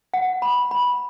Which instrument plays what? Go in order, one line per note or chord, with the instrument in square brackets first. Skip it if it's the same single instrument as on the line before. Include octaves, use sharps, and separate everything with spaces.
[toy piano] F#5
B5
B5